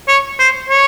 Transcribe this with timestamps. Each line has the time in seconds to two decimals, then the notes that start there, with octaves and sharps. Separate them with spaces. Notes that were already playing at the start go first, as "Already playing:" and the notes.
0.08 C#5
0.39 C5
0.69 C#5